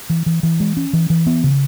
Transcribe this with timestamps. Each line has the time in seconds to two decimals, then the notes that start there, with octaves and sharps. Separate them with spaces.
0.10 E3
0.26 E3
0.43 E3
0.60 G#3
0.77 C#4
0.93 E3
1.10 E3
1.26 B3
1.44 C#3